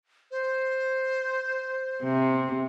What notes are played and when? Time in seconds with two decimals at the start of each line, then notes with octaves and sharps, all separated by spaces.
0.31 C5
2.03 C3